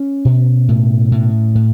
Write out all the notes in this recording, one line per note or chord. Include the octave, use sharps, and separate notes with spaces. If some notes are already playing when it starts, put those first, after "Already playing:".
Already playing: C#4
B2
A2
A2
A2